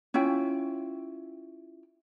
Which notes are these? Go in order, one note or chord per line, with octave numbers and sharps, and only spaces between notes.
C#4 E4 F4 G5